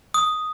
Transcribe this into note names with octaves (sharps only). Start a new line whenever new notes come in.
D#6